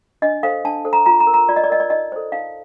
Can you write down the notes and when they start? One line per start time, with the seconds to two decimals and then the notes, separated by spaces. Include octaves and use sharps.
0.22 D4 D#5
0.43 A4 C5 F5
0.64 D4 A5
0.85 A4 C5
0.93 A#5
1.06 F4 A#5
1.20 A#5
1.27 A#4
1.34 A#5
1.49 F4 D5
1.56 D#5
1.64 D5
1.70 A#4 D#5
1.80 D5
1.90 D#4 D#5
2.12 A4 C5
2.32 D#4 F5